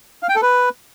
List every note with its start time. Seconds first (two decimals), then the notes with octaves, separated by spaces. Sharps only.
0.23 F5
0.29 G5
0.36 A4
0.42 B4